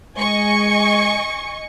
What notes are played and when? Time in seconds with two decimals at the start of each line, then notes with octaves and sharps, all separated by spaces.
0.18 G#3 D#5 G#5 C#6